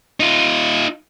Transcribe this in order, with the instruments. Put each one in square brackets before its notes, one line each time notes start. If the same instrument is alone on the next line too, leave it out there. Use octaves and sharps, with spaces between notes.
[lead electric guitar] D#4 F4